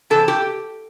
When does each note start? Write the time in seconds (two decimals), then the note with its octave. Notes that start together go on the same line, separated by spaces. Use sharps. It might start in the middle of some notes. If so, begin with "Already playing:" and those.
0.10 C3 E3 A4
0.28 G4